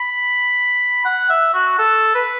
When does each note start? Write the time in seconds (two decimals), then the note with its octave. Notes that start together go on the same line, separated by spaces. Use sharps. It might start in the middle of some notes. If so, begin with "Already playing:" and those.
Already playing: B5
1.05 F#5
1.29 E5
1.54 F#4
1.79 A4
2.15 B4